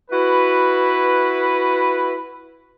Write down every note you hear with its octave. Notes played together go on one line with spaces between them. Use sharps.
E4 F#4 B4